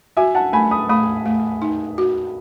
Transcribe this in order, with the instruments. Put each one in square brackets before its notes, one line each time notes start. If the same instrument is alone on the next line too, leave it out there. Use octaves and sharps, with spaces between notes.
[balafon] F#4 [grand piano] E5 G#5
[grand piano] F#5 A5
[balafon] A3 [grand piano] G#5 B5
[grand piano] B5 D#6
[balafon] A3 [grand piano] B5 D#6
[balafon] A3
D#4
F#4